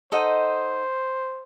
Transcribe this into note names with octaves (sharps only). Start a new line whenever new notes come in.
D#4 A4 C5 D#5 F#5